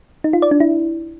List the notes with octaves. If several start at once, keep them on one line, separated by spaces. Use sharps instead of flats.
D#4
F4
D5
D4
E4